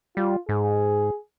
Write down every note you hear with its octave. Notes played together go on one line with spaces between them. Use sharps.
G3 F4
G#2 G#4